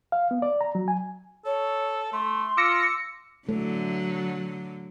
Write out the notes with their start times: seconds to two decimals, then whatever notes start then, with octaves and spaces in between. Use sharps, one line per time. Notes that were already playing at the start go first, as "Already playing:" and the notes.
0.12 F5
0.31 B3
0.42 D5
0.61 A#5
0.75 F#3
0.88 G#5
1.45 A4 C#5
2.13 A3 C6
2.57 F4 D6 E6 A#6 C#7
3.49 D3 F#3 A3